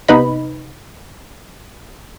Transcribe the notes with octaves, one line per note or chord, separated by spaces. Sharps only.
C3 B3 D#4 B4 D#5 B5